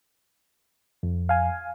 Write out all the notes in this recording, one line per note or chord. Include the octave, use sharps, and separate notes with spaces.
F2
F5 G#5